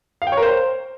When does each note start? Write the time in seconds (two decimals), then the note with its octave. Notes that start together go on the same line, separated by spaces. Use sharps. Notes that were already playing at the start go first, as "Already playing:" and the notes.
0.22 F5
0.27 G5
0.32 C#5
0.37 A#4
0.43 C5